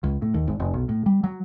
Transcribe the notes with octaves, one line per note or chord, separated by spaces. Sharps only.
C#2
A2
D#2
G#1
F1
B1
A2
G3
F#3